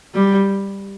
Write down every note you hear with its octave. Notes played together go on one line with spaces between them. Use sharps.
G3